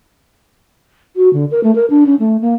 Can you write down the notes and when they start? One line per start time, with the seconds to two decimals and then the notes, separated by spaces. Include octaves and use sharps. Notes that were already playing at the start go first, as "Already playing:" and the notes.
1.16 F#4
1.33 D3
1.51 A#4
1.64 A3
1.75 A#4
1.90 D4
2.06 C#4
2.19 A3
2.41 A#3